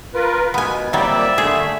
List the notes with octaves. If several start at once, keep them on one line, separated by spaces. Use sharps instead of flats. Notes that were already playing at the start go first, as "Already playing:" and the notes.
F4 A#4 B4
B2 B3 G#5
F2 F#3 G3 A#3 D5 E5
D3 A3 G#4